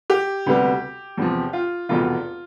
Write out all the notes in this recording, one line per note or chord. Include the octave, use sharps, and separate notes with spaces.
G4
D2 C3 G3 B3
E2 C3 F3
F4
F1 E2 B2 F4